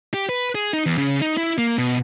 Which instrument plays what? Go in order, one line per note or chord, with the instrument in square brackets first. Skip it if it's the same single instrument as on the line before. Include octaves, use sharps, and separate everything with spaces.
[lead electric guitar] G4
B4
G#4
D#4
E2
C#3
D#4
E4
A#3
B2